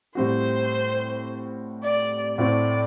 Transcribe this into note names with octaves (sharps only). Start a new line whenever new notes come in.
A2 G3 C4 F#4 C5
D5
A2 A3 C4 F#4 D5